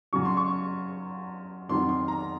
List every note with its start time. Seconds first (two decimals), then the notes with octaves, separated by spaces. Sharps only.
0.13 F#2 C#3 F#3 C#6
0.25 C6
0.37 C#6
1.69 F2 D#3 F#3 C6
1.89 C6
2.08 A#5